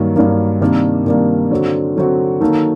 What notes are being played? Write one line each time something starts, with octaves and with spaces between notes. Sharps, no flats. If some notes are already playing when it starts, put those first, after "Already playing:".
Already playing: G2 D#3 F#3 A#3
G2 D#3 F#3 A#3
C3 D#3 G3 A#3 D4
C3 D#3 G3 A#3 D4
D3 F#3 C4 F#4
D3 F#3 C4 F#4
D#3 F#3 A#3 D#4 A4